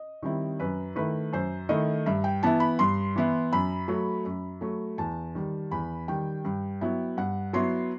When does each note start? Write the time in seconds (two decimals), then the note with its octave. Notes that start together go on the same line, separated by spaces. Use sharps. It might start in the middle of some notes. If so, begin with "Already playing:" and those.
Already playing: D#5
0.23 D#3 G3 C4 E4
0.60 F#2 B4
0.96 D#3 A3 E4 B4
1.33 F#2 C5
1.69 D#3 A3 E4 D#5
2.06 G2 E5
2.24 G5
2.43 E3 B3 E4 A5
2.60 B5
2.79 G2 C6
3.16 E3 B3 E4
3.53 F#2 B5
3.88 F#3 A3
4.25 F#2
4.61 F#3 A3
4.98 E2 A5
5.35 D#3 G3
5.71 E2 B5
6.08 D#3 G3 G5
6.45 G2
6.81 F#3 B3 E4
7.17 G2 F#5
7.53 F#3 B3 E4 C6